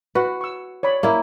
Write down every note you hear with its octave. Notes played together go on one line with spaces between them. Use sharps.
F#4 B4
C#6 E6
C#5 D5 B5
A#3 E4